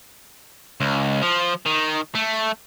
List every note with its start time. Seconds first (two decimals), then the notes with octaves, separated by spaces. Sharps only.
0.80 C#2
1.22 F3
1.66 D#3
2.15 A3